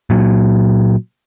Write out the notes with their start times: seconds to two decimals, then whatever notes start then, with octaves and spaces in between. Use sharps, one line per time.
0.10 A#2 F#3